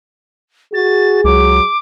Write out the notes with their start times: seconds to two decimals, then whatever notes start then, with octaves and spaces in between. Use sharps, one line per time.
0.74 F#4 G#4 A6
1.24 C#2 F#3 D6